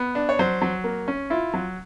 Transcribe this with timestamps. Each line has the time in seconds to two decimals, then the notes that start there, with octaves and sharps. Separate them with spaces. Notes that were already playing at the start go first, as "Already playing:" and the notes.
Already playing: B3
0.15 D4
0.29 C#5
0.39 F#3 C5
0.62 F#3
0.84 A#3
1.08 C#4
1.30 E4 F4
1.54 F#3